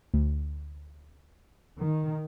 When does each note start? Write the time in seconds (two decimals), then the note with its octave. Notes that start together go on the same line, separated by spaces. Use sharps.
0.14 D2
1.81 D#3